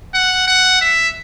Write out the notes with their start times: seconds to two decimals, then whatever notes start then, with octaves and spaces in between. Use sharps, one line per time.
0.14 F#5
0.47 F#5
0.81 E5